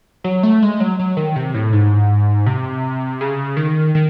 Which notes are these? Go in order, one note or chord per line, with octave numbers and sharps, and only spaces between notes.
F#3
A3
G#3
F#3
F#3
D#3
C3
A2
G#2
C3
C#3
D#3
D#3